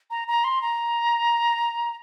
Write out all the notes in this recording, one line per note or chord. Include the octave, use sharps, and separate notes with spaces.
A#5
A#5
C6
A#5